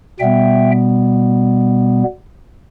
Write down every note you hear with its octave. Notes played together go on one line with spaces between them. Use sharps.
B2 G3 B3 E5 G5